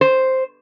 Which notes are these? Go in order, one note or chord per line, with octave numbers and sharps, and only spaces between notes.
C5